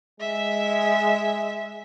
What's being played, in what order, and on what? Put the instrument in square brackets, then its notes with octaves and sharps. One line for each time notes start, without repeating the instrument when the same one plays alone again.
[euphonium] G#3 [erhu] E5